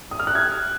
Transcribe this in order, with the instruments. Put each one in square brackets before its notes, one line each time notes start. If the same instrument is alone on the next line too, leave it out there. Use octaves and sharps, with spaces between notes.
[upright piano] D#6
F6
F#6
G#6